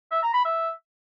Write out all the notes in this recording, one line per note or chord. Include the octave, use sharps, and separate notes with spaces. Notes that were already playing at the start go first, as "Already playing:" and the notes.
E5
A#5
B5
E5